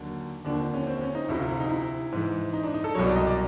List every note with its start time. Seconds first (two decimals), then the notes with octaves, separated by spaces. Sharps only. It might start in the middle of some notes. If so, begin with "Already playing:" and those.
Already playing: D#2 D3 F#3
0.45 D#2 D3 F3 D4
0.59 C4
0.74 C#4
0.87 C4
0.97 C4
1.01 C#4
1.15 D#4
1.29 D2 C3 F3 E4
1.40 F4
1.49 E4
1.60 D#4
1.70 E4
2.12 G#2 E3
2.53 D#4
2.64 D4
2.74 D#4
2.84 A4
2.95 C2 B2 F#3 C#5
3.06 D5
3.16 D#5
3.27 D5